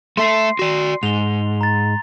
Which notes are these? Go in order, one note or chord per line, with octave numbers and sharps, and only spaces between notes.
A3 A4 E5 C6 C7
F#4 D5
G#2 F7 G7
A#5 A6